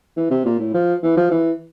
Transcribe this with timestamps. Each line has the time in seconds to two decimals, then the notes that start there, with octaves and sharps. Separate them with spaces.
0.17 E3
0.31 C3
0.46 A#2
0.60 A2
0.74 F3
1.03 E3
1.17 F3
1.31 E3